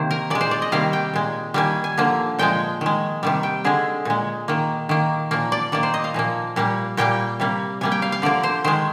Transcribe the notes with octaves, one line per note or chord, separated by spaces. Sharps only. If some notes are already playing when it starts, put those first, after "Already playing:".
Already playing: C3 D#3 A#3 C5
A#4
A#2 G#3 D5
C5
D5
D#5
C3 D#3 G3 A#3 F5
G5
A#2 G#3
D#3 G3 A#3 G#5
G#5
D3 F3 A#3
A#2 F3 G#3 G5
D#3 G#3
C3 D#3 G3
G5
D3 G#3 G#4
A#2 G#3
D#3 A#3
D#3 A#3
A#2 F3 A#3
D5
D#3 A#3 D5
C5
D#5
F5
A#2 F3 A#3
A#2 G3 A#3
A#2 G3 A#3 G5
C3 G3 A#3
C3 G3 A#3 G#5
G5
F5
F5
D3 F3 A#3 D5
C5
D#3 G#3 C5